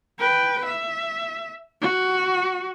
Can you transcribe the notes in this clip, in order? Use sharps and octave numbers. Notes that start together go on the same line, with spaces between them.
B4 G5
E5
F#4